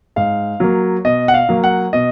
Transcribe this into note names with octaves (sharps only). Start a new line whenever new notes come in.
G#2 F5
F#3 A#3
B2 D#5
F#5
F5
F#3 A#3
F#5
B2 D#5